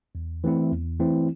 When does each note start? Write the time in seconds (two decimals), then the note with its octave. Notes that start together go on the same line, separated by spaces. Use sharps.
0.15 E2
0.44 E3 A3 C4 E4
0.71 E2
1.00 E3 A3 C4 E4